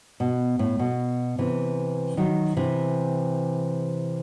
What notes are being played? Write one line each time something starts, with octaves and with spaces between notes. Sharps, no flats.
B2
A2
B2
C3 E3
D#3 F#3
C3 E3